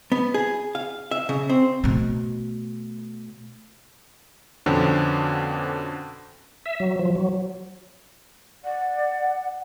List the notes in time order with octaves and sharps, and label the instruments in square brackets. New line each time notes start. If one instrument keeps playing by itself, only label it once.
[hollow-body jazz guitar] B3
G#4
F5
E5
C#3
C4
[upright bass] B2 A3
[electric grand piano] F2 B2 D3 C4 C#4
[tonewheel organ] E5
F#3
F3
F#3
[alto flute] D5 [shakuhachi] F#5